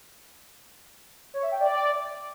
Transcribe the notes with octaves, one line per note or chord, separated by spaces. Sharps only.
C#5
E5
G5
D5